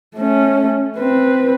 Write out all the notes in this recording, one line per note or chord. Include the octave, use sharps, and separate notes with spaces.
A3 C#4
C4 B4